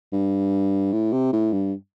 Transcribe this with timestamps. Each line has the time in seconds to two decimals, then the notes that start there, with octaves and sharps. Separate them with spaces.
0.13 G2
0.93 A2
1.13 C3
1.33 A2
1.52 G2